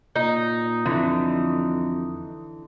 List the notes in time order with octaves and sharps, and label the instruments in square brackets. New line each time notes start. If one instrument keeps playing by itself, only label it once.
[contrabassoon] A#2 [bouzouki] D#4
[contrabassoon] F2 [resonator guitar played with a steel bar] D3 E3